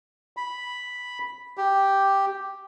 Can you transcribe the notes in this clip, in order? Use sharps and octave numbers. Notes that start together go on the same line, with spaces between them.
B5
G4